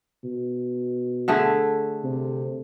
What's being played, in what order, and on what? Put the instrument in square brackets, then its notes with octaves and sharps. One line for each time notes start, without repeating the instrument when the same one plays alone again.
[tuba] B2
[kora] D3 A3 G#4
[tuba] C3